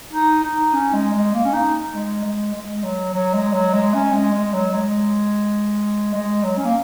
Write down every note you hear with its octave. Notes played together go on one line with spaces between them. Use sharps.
D#4
D#4
C#4
G#3
G#3
A#3
C#4
D#4
G#3
G#3
G#3
F#3
F#3
G#3
F#3
G#3
C#4
G#3
G#3
F#3
G#3
G#3
F#3
C#4
A#3